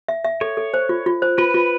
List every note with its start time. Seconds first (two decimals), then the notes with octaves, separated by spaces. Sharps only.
0.08 E5
0.25 E5
0.41 A4 C#5
0.57 A4
0.74 C5
0.89 F4
1.06 F4
1.22 C5
1.38 F4 B4
1.54 F4